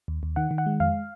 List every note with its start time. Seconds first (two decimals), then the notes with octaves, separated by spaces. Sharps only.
0.08 D#2
0.23 D#2
0.36 D#3 F#5
0.51 D#3
0.58 F#5
0.66 G#3
0.80 F2 F5